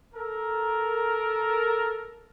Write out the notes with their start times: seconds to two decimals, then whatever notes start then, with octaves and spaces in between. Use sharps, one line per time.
0.14 A4 A#4